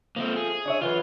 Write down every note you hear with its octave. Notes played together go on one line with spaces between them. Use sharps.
F3 A3 A#3 C4
G#4
D4 C#5 E5
E3 F#3 F4 B4